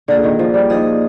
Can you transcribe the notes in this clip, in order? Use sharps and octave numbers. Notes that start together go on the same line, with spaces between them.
D3 A#3 F4 G#4
D#3
F3
G3
F3 A#3 D#4 G#4 D#5